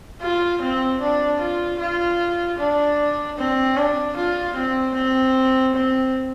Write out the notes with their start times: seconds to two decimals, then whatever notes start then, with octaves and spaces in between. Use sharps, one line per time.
0.22 F4
0.62 C4
1.01 D4
1.40 F4
1.79 F4
2.59 D4
3.38 C4
3.77 D4
4.16 F4
4.56 C4
4.95 C4
5.75 C4